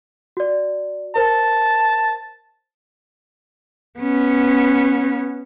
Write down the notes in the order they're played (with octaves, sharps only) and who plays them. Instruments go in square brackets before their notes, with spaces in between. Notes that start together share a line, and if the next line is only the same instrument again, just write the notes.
[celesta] F#4 D5
[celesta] A#4 C5 [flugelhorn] A5
[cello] B3 C#4